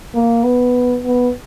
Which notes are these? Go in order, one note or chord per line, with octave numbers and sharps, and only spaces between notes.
A#3
B3
B3